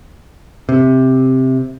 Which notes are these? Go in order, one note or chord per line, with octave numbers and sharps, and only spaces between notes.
C3